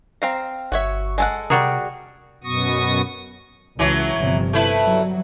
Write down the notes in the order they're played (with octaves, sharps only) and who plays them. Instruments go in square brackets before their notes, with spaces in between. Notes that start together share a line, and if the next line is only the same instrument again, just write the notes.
[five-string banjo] C4 F5 A#5
[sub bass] G1 [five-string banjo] F#4 C#5 E5
[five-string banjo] G#3 A4 F#5
[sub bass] C3 [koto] G3 F#4 G#4 [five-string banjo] A#4
[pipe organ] F#2 B2 B3 C#6 D#6 A#6
[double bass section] C#2 [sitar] E3 F#3
[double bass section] G1 C3 F3
[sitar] A3 E4 B4
[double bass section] F#3 G3